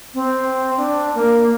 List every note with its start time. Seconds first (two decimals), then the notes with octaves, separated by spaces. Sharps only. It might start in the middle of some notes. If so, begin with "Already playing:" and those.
0.14 C4
0.77 D4
1.15 A#3